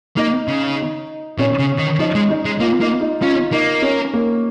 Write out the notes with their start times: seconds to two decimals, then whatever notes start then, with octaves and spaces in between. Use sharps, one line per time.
0.17 A#3 D#4
0.48 C#3
1.38 A#2 C#4
1.59 C#3
1.79 D#3
1.99 F3 D#4
2.15 G#3
2.30 D#4
2.45 G#3
2.60 A#3 F4
2.81 A#3 D#4
3.01 D#4
3.22 C#4 F4
3.52 A#3 D#4
3.82 C#4
4.14 A#3